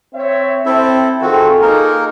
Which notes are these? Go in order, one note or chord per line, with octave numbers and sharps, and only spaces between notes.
C4 C#5 E5
C4 E4 A4 E5
D#3 C4 F4 F#4 G#4 A4
A#3 D#4 A#4